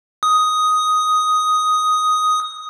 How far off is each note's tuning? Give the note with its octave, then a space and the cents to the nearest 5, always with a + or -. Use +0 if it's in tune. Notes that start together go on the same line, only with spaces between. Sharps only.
D#6 +5